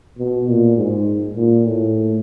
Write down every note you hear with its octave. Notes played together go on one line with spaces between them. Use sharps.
B2
A#2
G#2
A#2
A2